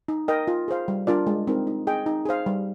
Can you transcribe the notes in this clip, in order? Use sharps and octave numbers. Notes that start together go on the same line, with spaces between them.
D#4
A#4 D#5 G5
F4
G#4 C5 F5
G3
D4 F4 A#4 D5
G#3
C4 D#4 A#4
D#4
G#4 D#5 G5
D#4
G#4 C5 F5
G3